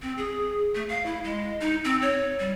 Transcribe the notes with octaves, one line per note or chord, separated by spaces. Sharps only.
C4
G#4
A3
F5
E4
G#3
D#4
C4
C#5
G3